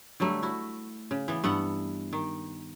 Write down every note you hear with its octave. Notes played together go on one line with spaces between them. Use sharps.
D3 F#3 G3 A3
E4 F#4
C#3
E3 B3
G2 B3 A4 F#5
D#3